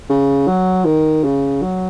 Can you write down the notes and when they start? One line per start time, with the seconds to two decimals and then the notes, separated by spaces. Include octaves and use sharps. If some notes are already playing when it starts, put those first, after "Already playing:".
0.09 C#3
0.47 F#3
0.85 D#3
1.24 C#3
1.62 F#3